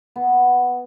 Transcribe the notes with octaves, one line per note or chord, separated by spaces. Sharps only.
B3